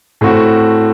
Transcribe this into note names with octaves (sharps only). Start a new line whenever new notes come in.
A2 A3 C4 F#4